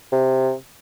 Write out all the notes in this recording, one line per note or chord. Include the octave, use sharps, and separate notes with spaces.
C3